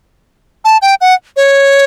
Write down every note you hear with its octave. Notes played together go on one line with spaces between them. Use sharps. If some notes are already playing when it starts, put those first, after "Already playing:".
A5
G5
F#5
C#5